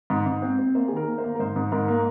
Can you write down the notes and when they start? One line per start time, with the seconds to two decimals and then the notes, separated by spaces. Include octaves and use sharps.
0.10 G#2
0.26 G#2
0.42 C4
0.59 C4
0.75 A#3 C5
0.88 G#4
0.92 D#3 A#4
1.07 A#3
1.18 C5
1.24 A#3
1.35 A#4
1.39 G#2 C5
1.56 G#2
1.72 G#2 A#4
1.88 A#3